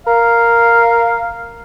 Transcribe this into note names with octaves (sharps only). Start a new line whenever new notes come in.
A#4 F5